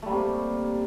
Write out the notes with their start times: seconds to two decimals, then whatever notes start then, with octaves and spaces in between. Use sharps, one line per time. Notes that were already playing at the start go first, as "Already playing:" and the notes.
0.02 A3
0.06 G3
0.09 A#3
0.12 C3